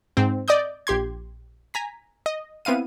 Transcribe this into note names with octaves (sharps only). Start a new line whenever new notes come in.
G#2 C4
D5 D#5 D#6 G6
A#1 G4 C6 G#6
G#5 A#5 B6
D#5
B3 C4 E4 F5 D#7